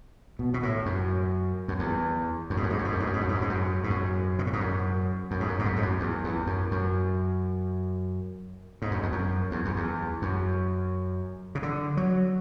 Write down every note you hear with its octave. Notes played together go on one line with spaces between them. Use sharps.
B2
B2
A2
F#2
F#2
E2
F#2
G#2
F#2
G#2
F#2
G#2
F#2
G#2
F#2
G#2
F#2
G#2
F#2
G#2
F#2
G#2
F#2
B2
A2
G#2
F#2
F#2
G#2
F#2
G#2
F#2
G#2
F#2
E2
E2
F#2
F#2
G#2
F#2
E2
F#2
E2
F#2
E2
F#2
C#3
D3
F#3